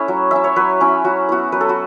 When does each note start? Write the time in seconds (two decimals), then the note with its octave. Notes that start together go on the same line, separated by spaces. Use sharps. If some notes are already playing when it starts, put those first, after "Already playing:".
Already playing: A3 C#4 E4 B4 C#5 E5
0.08 F#3
0.31 C#4 E4 E5
0.44 C#5
0.56 F#3 B4
0.80 C#4 E4
1.04 F#3 F#4
1.29 B3 E4 F#4
1.52 F#3 B4
1.61 A4
1.69 F#4